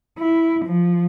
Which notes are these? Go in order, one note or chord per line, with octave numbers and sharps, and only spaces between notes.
E4
F3